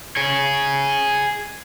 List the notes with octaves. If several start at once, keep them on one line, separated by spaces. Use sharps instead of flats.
G#4 C#5